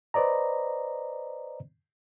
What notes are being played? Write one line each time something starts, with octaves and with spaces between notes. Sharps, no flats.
B4 C5 D5 D#5 A#5